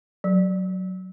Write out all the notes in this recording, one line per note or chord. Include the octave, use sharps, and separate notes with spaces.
F#3